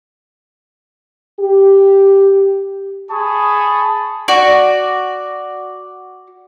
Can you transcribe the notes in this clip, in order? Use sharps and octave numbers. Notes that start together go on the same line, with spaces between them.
G4
G#4 A5 B5 C#6 D#6
F#4 D5 C#6